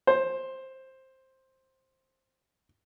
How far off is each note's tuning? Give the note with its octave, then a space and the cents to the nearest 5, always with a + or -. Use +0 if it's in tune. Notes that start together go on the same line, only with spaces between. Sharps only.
C5 +10